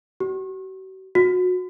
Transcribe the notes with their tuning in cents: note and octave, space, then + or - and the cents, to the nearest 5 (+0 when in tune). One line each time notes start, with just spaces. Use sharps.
F#4 +45
F#4 -25